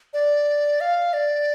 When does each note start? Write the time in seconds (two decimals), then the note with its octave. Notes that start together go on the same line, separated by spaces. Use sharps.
0.13 D5
0.81 F5
1.13 D5